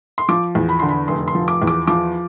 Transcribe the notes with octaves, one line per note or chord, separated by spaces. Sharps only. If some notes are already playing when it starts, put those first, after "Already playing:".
C6
F3 D6
E2
B5
D3 C6
B5
F1 C6
C6
F3
D6
E2
D6
F3 D6